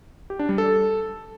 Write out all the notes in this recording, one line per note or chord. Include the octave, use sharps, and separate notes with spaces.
G4
D4
G3
A4